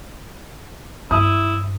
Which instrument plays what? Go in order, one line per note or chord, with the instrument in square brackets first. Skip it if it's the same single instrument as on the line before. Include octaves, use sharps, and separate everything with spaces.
[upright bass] G2 [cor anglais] E4 [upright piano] D#6